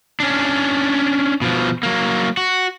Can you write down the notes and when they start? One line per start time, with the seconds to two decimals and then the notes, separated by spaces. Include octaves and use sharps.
0.20 C#4 D4
1.42 B2 F3
1.83 F#3 A#3
2.37 F#4